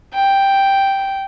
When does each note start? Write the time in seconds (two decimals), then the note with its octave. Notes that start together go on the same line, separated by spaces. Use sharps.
0.14 G5